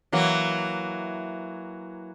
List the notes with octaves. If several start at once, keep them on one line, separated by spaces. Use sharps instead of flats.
E3 F#3 A#3